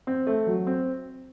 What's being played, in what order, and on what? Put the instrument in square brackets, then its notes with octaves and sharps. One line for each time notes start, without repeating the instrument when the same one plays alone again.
[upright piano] C4
A3
F#3
C4